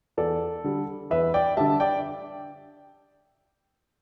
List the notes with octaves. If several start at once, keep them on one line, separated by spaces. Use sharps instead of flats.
E2 A4 D5
D3 G3
E2 B4 E5
D5 G5
D3 G3 E5 A5
D5 G5